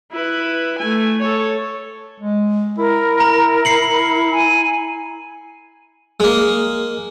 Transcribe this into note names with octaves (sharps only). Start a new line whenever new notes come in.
E4 B4
A3 G#5
A4 C#5
G#3
E4 A#4
A#5
C7 C#7 F#7
G#5
G#3 A#3